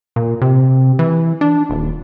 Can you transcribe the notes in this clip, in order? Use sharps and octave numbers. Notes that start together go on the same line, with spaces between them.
A#2
C3
E3
D4
D#1